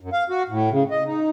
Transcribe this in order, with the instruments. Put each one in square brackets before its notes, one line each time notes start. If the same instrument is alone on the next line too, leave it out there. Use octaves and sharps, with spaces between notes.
[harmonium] F#2
F5
F#4
A2
C#3
D#5
D#4